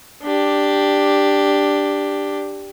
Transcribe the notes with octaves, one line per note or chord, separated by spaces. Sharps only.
D4 G4